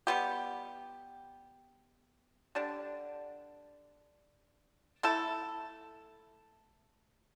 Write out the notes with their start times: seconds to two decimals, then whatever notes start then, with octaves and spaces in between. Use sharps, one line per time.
0.07 G3 B3 G4
2.55 D3 G3 D4
5.03 A3 E4 A4